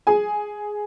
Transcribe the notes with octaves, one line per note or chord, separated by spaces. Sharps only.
G#4 G#5